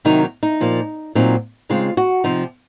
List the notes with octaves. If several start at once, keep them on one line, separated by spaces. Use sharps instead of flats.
C3 D#3 F#3 A#3 D#4
D#4
A#2 F3 A#3
A#2 F#3 C4 D#4
C#3 G#3 C4 D#4 F4
F#4
C3 F3 C4 D#4